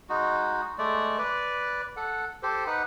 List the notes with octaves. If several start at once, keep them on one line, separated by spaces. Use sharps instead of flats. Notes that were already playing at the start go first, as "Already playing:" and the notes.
G#3 D#4 F#4
G#3 A3 D5
B4 D5
A4 F#5
G4 A4 C5
D#4 B4 F#5